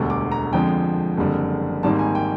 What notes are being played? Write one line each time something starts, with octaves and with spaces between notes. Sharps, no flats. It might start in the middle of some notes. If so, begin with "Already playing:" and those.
Already playing: E1 D2 D3 G3
D6
A#5
F2 D3 F3 G#3 G5
F#1 F2 D3 G3
G#1 G#2 D#3 G3 A#3 A5
G#5
G5